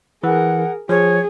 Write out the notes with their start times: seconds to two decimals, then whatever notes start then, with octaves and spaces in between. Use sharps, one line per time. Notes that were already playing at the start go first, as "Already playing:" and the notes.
0.24 E3 G#4 A#4 F#5
0.89 F3 G#4 C#5